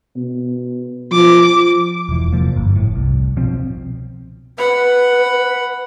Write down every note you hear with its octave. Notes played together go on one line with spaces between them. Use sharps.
B2
F3 D6
E1 E3
F1 C3 F3 A#3
G1
A2
C2
B2 F3 C4
B4 F#5 B5